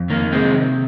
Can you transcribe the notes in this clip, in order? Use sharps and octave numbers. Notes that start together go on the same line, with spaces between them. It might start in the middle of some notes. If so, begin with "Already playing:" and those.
Already playing: F2
D#3 A#3
C3 G#3 C4